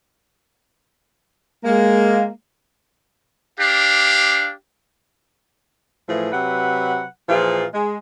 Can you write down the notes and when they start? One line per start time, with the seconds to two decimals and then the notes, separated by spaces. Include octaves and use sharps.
1.64 G#3 A#3
3.60 D4 G4 F5
6.09 A2 E3 F3 G#4
6.32 C3 F#3 B4 F#5
7.29 A#2 E3 F3 F4 G#4
7.74 G#3